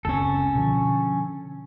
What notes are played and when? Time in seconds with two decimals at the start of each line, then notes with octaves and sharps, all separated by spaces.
0.05 F#1 C#2 C4 C#4 A4
0.55 B2 D3 F3